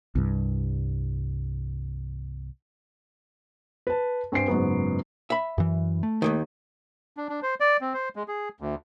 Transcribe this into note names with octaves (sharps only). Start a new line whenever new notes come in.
C2 G2
B4 A5
G2 C4 C5 G#5 C7 D7
F#1 G#2 F#3 B3
E5 B5
F#2 E3
A3
D#2 G#2 D#3
D4
D4
C5
D5
C4
C5
G#3
G#4
D2